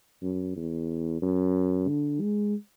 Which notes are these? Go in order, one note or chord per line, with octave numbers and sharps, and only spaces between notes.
F#2
E2
F#2
D3
G#3